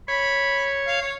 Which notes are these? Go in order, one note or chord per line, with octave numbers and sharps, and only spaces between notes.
C#5 B5
F5
C#5